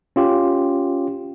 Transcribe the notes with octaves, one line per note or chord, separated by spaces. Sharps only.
C#4 F4 G4